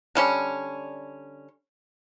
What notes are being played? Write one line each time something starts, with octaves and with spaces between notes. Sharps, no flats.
D3 G3 C#4